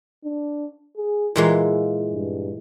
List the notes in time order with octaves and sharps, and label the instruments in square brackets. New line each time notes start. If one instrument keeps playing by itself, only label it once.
[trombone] D4
G#4
[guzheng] A#2 E3 G#3 [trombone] F4
[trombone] G2